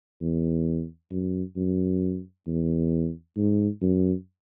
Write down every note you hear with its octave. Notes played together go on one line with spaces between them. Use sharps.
E2
F#2
F#2
E2
G#2
F#2